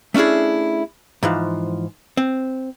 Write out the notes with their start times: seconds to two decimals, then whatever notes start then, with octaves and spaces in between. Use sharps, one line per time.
0.14 A3 C#4 D4 E4 G#4
1.23 G#2 E3 F3
2.17 C4